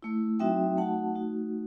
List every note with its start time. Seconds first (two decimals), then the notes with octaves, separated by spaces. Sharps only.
0.02 A3 E4
0.40 F#3 C4 D#4 F#4 E5 G5
0.77 A3 D#4 F#4 F#5 A5
1.15 A3 D#4 F#4